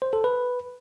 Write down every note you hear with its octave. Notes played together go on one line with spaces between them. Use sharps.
C5
A4
B4